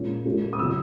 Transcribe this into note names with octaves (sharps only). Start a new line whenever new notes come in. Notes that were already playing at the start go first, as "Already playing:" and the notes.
Already playing: A#2 G#3 C#4
A#2 G#3 C#4
D#6
C#3 F#3 C#4 E6